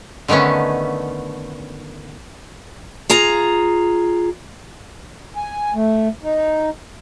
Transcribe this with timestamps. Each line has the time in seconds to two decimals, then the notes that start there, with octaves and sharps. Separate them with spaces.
0.28 D3 D#3 A3 B3 C#4
3.10 F4 G#4 A#5
5.36 G#5
5.74 A3
6.23 D#4